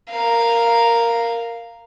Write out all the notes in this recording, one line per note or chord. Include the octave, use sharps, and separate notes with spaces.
A#4 F5